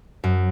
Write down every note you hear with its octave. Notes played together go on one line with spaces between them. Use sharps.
F#2